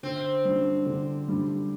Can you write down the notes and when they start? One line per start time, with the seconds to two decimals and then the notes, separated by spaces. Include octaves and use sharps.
0.03 D3 C4
0.45 G3 D4
0.86 D3
1.28 G3 D4